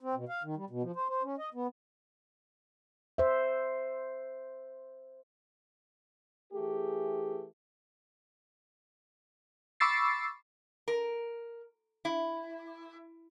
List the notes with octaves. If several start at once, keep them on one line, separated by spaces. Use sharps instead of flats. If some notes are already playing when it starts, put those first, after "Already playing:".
C4
B2
F5
D#3
G3
B2
F3
C5
C5
C#4
D#5
B3
C5 E5
E3 A3 G4 G#4
B5 C#6 D6 E6 A6 C7
A#4
E4